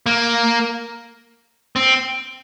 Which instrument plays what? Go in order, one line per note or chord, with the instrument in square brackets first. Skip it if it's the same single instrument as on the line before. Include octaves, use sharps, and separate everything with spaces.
[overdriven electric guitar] A#3
C4